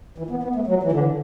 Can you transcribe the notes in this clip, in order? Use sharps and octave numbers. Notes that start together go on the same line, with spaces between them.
E3
B3
B3
A3
F#3
E3
D3